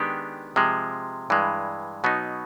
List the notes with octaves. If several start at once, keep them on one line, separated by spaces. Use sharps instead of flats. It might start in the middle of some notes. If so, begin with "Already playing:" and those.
Already playing: D#3 G#3 B3 D4 G4
C3 F3 G#3
G2 E3 G#3
B2 F#3 B3 D#4